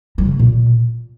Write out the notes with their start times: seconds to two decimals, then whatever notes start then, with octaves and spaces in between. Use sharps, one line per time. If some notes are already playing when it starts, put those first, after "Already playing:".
0.18 F#3
0.25 C#3
0.32 A3
0.39 A#2